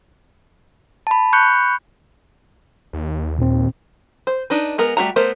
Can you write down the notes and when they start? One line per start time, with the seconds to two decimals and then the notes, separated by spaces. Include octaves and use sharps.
1.07 A5 B5
1.33 B5 C#6 F#6 G6 C#7
2.93 D#2
3.38 A#2 C4
4.27 C5
4.50 D4 D#4 B4
4.78 G#3 B3 A#4
4.97 G3 A3 E4 F#4 A#5
5.16 A3 B3 A#4 C5